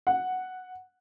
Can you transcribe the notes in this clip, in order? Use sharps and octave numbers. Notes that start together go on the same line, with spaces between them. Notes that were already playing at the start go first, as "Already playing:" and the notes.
F#5